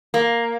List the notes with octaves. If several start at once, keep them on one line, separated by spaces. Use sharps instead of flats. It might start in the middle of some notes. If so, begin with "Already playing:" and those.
A#3